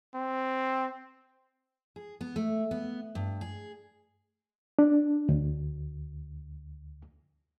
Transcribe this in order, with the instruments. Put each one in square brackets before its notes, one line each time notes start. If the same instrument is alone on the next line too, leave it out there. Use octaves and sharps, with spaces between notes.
[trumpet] C4
[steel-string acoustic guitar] G#4
B3
A3
B3
G2
G#4
[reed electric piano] D4
D2